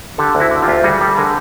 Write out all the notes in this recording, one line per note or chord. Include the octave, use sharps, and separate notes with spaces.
D3 G4 A4
D2
E4 F#4
D3
F4 G4
D2
G3 F#4 G#4
G3 G4 A4
D3 G#4 A#4